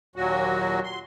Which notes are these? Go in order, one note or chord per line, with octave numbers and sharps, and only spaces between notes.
D#2 A#2 F#3 F#4
C6